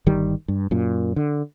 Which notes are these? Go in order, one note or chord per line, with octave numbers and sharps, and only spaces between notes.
G1 D#3 G3
G2
F#2 A#2
D3